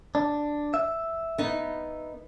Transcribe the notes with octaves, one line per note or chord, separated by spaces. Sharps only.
D4
E5
B3 D#4